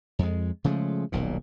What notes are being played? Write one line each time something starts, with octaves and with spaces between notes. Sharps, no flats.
F2 G#3
C#3 F3 G#3 A3
D#1 B1 A#2